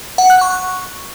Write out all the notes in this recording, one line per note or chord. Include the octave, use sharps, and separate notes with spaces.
F#5
F#6
C#6